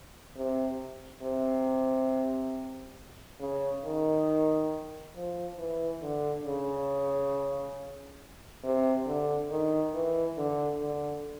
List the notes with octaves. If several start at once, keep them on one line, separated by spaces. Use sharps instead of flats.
C3
C3
C#3
D#3
F3
E3
D3
C#3
C3
D3
D#3
E3
D3
D3